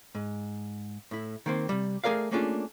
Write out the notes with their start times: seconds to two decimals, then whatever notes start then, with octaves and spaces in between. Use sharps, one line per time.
0.15 G#2
1.11 A2 E4
1.46 D#3 A#3 C4
1.69 C3 G3
2.04 A3 G#4 A#4 D5 F5
2.32 A3 A#3 C#4 D4 F4 G#4